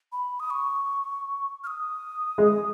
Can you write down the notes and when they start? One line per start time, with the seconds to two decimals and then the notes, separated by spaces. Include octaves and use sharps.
0.12 B5
0.40 D#6
0.50 C#6
1.64 F6
1.67 D#6
2.38 G#3